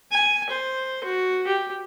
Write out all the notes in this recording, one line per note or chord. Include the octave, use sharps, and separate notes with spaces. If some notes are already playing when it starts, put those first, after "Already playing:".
G#5
C5
F#4
G4